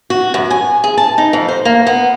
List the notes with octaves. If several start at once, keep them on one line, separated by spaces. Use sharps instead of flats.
F#4
F#2
G#5
G#4
A5
D#4
F2
C5
A#3
B3